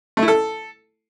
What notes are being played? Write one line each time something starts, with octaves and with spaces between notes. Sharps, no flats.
A3
E4
A4